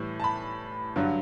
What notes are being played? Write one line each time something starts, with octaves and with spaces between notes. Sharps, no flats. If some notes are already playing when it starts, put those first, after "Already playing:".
Already playing: A2 E3 G3
A5
B5
G2 D3 F#3